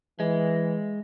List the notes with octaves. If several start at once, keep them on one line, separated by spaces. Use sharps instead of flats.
E3 G#3